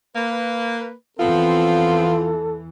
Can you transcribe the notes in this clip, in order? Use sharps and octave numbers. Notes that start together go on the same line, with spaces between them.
A#3 B4
E2 E3 F3 B3 C4 F4 A4